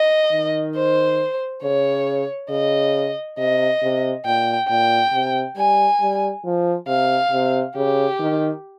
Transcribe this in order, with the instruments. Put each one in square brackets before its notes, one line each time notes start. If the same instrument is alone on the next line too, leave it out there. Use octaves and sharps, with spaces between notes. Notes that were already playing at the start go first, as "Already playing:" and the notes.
Already playing: [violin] D#5
[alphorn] D#3
[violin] C5
[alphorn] C#3 [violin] C#5
[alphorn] C#3 [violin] D#5
[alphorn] C3 [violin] D#5
[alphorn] C3
[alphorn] A#2 [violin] G5
[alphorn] A#2 [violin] G5
[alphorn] C3
[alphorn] G3 [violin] G#5
[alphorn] G3
F3
[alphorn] C3 [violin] F5
[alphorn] C3
[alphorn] C#3 [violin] G4
[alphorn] D#3